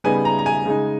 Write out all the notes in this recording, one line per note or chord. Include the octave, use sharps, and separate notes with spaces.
C#3 G3 B3 D#4 G#5
A#5
A#5
G#5
C#3 G#3 D#4